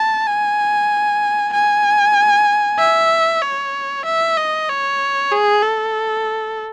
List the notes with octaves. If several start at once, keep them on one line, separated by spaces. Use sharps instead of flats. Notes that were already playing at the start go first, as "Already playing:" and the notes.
Already playing: A5
G#5
G#5
E5
C#5
E5
D#5
C#5
G#4
A4